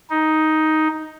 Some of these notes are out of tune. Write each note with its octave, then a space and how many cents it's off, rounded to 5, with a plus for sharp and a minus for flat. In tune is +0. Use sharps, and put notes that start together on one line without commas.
D#4 +5